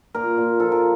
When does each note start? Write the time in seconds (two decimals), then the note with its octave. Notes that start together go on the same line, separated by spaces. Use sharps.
0.14 A#2 A#4
0.37 A#2
0.60 F3 A4
0.72 A#4